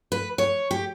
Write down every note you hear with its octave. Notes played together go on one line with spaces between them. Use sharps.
B4
C#5
G4